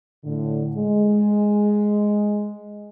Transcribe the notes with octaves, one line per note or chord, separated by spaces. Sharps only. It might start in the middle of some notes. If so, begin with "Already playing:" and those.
A2 D3
G#3